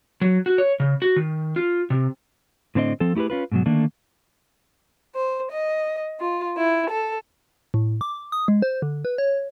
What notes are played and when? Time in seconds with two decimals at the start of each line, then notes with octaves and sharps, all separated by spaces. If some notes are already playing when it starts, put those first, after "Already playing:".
0.21 F#3
0.46 F#4
0.58 C#5
0.80 C#3
1.02 F#4
1.16 D#3
1.56 F4
1.90 C3
2.75 A2 D3 C4 D4 D#5
3.00 F3 C4 A4
3.15 A3 E4 G4 G#4 B4
3.30 C#4 F4 B4
3.52 G#2 B2 F#3
3.66 D3 D#3 A3 A#3 D4
5.15 C5
5.51 D#5
6.20 F4
6.57 E4
6.89 A4
7.74 A2
8.01 D6
8.32 D#6
8.48 G#3
8.62 C5
8.82 D3
9.05 B4
9.18 C#5